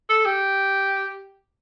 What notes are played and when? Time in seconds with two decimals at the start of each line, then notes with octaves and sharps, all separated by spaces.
0.09 A4
0.25 G4